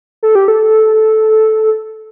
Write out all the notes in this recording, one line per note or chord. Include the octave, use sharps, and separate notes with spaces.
A4
G4
A4